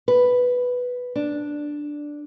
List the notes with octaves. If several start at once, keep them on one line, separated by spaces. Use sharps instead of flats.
B4
D4